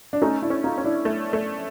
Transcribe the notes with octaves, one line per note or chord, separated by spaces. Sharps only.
D4
A3 C#4 D#4
D4 E4
C#4
D#4 F4
C#4
D4 E4
A3
A3